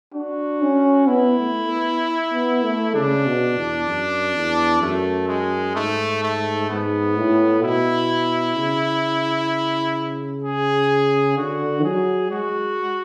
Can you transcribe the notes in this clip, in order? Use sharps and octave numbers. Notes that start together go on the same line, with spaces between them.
D4 F#4
C#4
B3 E4
A3
B3
B3
A3
C#3 D4
B2
E2
F#2
E2
F#2 A3
G#3
G#2 A3
A3
G#2 B3
A2
B2 E4
C#3
G#4
D3 F#4
F#3 G#4
G#3 F#4